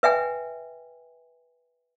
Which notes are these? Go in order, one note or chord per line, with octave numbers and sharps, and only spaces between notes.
B4 E5 G5 G#5